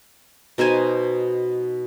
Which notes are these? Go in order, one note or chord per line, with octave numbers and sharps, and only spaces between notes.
B2 D#4 C5 G#5